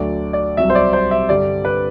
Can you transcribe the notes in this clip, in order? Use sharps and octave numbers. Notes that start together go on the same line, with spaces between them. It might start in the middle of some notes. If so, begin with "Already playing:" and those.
Already playing: D2 D3 F#3 D5
D5
C2 C3 F#3 E5
C5
D5
C5
E5
G2 D3 G3 D5
B4